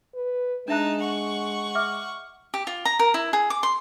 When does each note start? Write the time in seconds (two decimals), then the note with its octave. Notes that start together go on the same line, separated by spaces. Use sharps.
0.15 B4
0.68 G#3 D4 D#4 E5 A5 F#6
1.01 F#5 C#6
1.75 E5 D6 F6
2.54 G4
2.67 F4
2.85 A#5
2.99 A#4
3.14 E4
3.33 G#4
3.50 D6
3.63 C6